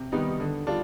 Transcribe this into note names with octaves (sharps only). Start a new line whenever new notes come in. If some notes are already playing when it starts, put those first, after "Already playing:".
Already playing: C3
D#3 G3 B3 D#4
D3
G3 D4 F4